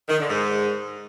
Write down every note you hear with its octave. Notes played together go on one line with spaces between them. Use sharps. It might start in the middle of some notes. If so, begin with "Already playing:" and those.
D#3
D3
G#2